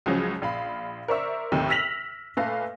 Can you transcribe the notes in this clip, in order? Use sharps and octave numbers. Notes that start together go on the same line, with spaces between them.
C#2 C#3 F3 F#3 C#4
A#1 F5 B5
A#4 C5 D5 E5 C#6 E6
D#2 A2 C3 D#3
E6 F6 A#6 B6 F7 F#7
A#2 A3 A4 B4 F5 A#6